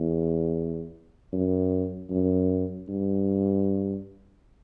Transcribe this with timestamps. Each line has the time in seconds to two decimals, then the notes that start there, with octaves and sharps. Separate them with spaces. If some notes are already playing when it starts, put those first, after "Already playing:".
Already playing: E2
1.33 F#2
2.10 F#2
2.88 G2